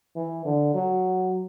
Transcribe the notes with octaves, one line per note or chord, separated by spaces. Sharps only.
E3
D3
F#3